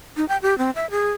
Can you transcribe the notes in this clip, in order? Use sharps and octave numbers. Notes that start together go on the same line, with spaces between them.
D#4
G5
G4
C4
E5
G#4